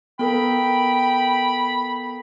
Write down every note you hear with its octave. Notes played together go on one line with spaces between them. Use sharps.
B3 A4 A#4 G5 B5